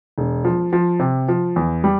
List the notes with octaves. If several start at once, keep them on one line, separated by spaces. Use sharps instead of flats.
E1
F3
F3
C3
F3
E2
G3